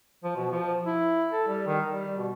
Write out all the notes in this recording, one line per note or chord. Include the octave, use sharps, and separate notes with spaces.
F3
B2
F3
E4
A4
G3
D#3
G3
B2